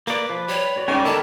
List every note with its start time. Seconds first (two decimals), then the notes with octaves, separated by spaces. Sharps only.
0.07 A#3 B4 D5 D6
0.30 F3 B4
0.48 G3 C#5
0.76 F#4 D5
0.88 G#2 G3 C#4 A#4
1.05 D3 D#3 B3 E4 A#4 E5 A5